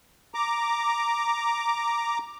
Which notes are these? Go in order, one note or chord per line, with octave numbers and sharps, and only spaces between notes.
A#5 D6